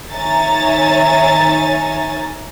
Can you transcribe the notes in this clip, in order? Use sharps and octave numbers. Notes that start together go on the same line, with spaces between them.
D#3 C#5 E5 G#5 A#5 A6